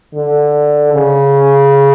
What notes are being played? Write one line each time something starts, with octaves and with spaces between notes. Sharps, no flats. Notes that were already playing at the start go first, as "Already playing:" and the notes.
D3
C#3